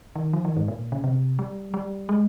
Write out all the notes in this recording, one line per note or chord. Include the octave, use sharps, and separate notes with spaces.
D#3
F3
D#3
G#2
A#2
C#3
C3
G3
G3
G#3